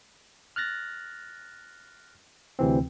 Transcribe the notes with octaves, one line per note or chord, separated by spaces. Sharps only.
F6 F#6 A6 A#6
D2 C3 E3 C4